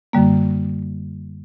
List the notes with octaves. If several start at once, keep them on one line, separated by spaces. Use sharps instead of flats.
F#2 D3 G3 A#3